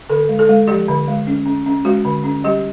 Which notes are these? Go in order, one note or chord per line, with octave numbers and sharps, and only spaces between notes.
D3 A4
G#3
A4
G#3
F3 G4
D3
G#3
C#4
C#4
C#4
G#3 F#4
D3
C#4
G3 G4